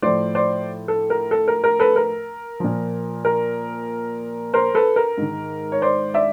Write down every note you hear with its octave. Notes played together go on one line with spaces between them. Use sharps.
A2 F3 C5 D5
C5 D5
A4
A#4
A4
A#4
A#4
A4 B4
A#4
A#2 F3
A#4
A#4 C5
A4 B4
A#4
G#2 D#3
C#5
C5 D5
D5 E5